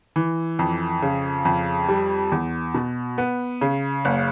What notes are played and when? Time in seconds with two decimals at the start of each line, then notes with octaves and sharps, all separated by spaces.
0.16 E3
0.59 F2
1.02 C#3
1.45 F2
1.89 G3
2.32 E2
2.74 B2
3.18 B3
3.61 C#3
4.05 F#1